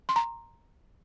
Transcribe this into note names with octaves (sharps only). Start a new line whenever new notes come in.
C6
A#5